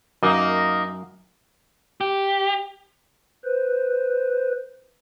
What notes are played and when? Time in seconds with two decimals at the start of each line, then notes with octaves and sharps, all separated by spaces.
0.23 F#2 A#3 D#4
2.01 G4
3.44 B4 C5